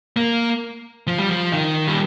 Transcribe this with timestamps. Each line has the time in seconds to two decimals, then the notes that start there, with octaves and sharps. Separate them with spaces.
0.17 A#3
1.07 F3
1.18 G3
1.29 F3
1.53 D#3
1.87 G3